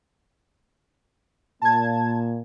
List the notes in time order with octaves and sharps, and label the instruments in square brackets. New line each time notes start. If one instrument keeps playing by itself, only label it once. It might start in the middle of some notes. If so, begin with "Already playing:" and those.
[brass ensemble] A#2 [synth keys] A5 G#6